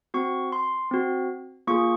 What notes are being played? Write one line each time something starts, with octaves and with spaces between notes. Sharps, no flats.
C4 F#4 C#6
C6
C4 F#4
A#3 F4 G#4 C#6